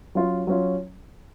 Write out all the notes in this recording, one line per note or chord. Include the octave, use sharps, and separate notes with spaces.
F#3 C#4 F4
F#3 C#4 F4